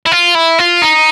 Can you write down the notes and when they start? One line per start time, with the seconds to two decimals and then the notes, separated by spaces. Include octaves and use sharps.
0.06 E4
0.12 F4
0.35 E4
0.59 F4
0.82 D#4